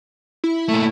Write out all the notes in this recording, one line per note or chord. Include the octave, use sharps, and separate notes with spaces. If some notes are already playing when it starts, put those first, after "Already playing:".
E4
A#2 A3